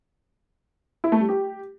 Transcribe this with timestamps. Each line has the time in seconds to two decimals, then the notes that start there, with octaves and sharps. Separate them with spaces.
1.04 E4
1.12 A3
1.20 G3
1.29 G4